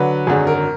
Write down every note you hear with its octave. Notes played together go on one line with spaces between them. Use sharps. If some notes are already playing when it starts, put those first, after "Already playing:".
Already playing: D3 F#3 B4
G#1 F#2 D3 F#3 G#4
A#4